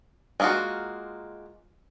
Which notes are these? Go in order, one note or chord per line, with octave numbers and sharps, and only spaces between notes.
G#3 A#3 C#4 F4 F#4